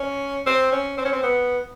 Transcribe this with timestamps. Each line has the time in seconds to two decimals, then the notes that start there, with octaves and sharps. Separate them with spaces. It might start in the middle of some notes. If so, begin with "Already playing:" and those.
Already playing: C#4
0.46 C4
0.72 C#4
0.98 C4
1.05 C#4
1.13 C4
1.23 B3